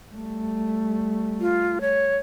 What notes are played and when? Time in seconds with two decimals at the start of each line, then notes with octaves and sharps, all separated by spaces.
0.15 G3 A3
1.40 F4
1.81 C#5